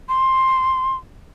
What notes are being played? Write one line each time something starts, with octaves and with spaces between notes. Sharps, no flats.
C6